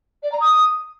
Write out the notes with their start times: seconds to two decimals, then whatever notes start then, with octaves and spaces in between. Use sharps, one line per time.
0.23 D5
0.32 A#5
0.41 D#6